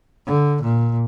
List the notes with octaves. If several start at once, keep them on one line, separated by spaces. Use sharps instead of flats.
D3
A#2